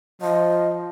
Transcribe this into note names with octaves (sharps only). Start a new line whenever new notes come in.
F3 D#5